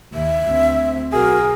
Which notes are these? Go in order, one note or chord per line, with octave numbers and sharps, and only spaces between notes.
D#2 E5
D2 C4
B1 F#4 G#4 A#4